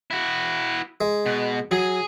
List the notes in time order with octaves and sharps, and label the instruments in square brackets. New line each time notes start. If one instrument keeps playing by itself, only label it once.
[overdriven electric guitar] E4 F#4
[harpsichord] G#3
[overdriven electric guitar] B2
[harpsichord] F#3 [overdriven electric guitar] G#4 G#5